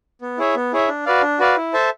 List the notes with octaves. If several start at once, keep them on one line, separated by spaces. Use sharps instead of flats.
B3
E4 G#4 C#5 E5
B3
E4 G#4 C#5 E5
D4
F#4 B4 D5 F5
D4
F#4 B4 D5 F5
E4
A4 C5 E5 A5